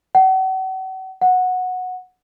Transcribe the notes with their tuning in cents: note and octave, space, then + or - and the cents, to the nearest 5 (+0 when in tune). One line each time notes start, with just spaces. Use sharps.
F#5 +40
F#5 -10